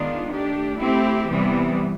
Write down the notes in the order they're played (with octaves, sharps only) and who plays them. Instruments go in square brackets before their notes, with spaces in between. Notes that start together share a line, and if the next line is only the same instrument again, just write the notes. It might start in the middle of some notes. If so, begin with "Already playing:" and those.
Already playing: [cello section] D#3 G#3 B3 D4 F4
A3 D4 G4
A3 C4 E4 G4
C3 E3 G3 B3